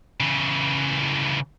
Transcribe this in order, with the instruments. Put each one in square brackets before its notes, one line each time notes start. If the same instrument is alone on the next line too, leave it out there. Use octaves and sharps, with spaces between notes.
[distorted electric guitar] C#3 E3